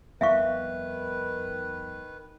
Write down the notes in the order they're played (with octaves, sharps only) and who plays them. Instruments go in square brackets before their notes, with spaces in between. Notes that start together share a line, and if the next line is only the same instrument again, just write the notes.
[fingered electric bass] F2 G3 B3 [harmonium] D#3 B4 [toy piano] E5 F5 C#6